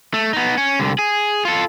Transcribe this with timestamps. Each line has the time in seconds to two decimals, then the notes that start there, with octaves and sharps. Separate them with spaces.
0.14 A3
0.33 B3 D#4
0.58 C#4
0.80 C2 D3
0.99 G#4
1.45 F4 A4